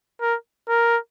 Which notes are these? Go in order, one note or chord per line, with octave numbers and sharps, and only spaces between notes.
A#4
A#4